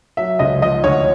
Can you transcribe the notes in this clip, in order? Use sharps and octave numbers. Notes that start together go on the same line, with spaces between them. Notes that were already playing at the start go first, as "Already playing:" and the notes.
F#3 E5
C#2 D#5
F3 D#5
D2 C#5